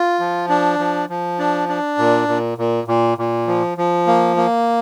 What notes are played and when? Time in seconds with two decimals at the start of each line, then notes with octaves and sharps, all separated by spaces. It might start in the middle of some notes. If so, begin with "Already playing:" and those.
Already playing: F4
0.19 F3
0.49 D4
0.79 F3
1.09 F3
1.39 D4
1.69 D4
1.98 A#2
2.28 A#2
2.58 A#2
2.88 A#2
3.18 A#2
3.47 F3
3.78 F3
4.07 A#3
4.36 A#3